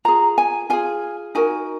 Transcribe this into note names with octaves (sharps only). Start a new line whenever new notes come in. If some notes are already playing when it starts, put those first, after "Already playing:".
F4 G#4 A#5
G#5
F4 G#4 G#5
D#4 F#4 A#4 G#5